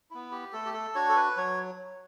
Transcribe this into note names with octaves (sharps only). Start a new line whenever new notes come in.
B3 E4
G4
A3 A4
G4
A4
D4 F#4 C#5
A4
B4
F#3 C#5